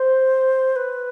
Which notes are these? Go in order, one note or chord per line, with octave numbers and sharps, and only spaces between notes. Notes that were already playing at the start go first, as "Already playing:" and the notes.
Already playing: C5
B4